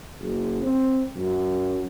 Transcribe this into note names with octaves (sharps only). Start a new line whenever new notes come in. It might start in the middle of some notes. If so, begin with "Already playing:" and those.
F#1
C4
F#2